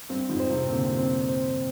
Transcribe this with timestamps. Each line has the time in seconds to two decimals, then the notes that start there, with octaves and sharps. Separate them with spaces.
0.09 G2 C4
0.29 F2 G#2
0.40 C5
0.49 G#2 C3
0.69 A#2 D3 C4
0.99 C4
1.29 C5